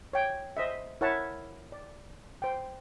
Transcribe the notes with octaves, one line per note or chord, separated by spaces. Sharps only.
C#5 G5
C5 D#5 E5
E4 A#4 C#5 E5 F#5 A5
D5
C5 G5